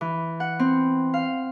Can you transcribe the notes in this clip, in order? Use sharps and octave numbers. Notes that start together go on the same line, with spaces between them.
E3
F#5
C4
F5